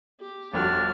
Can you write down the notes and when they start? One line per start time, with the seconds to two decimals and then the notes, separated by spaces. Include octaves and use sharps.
0.20 G4
0.54 G1 F2 D4 F#4 F6